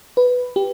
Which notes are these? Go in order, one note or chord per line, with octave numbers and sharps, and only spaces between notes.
B4
G4